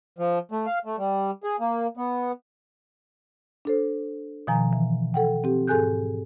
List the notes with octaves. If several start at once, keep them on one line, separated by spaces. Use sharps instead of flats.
F3
A3
F5
A3
G3
G#4
A#3
B3
D4 A4 C5
B2 D#3 F3 G#5 A#5
E3
A4 F#5 G5
C4 G4
G#2 G#4 A4 G#5 F#6 G6